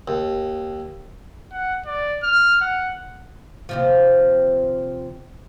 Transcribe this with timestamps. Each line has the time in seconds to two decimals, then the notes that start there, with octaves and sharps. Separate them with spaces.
0.08 D#2
1.52 F#5
1.86 D5
2.23 F6
2.61 F#5
3.69 D#2 C3 F3